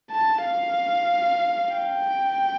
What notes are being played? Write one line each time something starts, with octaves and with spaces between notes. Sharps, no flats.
A5
F5
G5